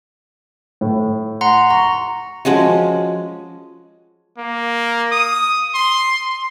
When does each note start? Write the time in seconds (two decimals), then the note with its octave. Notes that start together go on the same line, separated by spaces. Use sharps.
0.81 A2
1.41 F#5 A#5 C6
1.70 A#5 C#6
2.45 F3 G#3 C#4 F#4
4.38 A#3
5.12 D#6
5.74 C6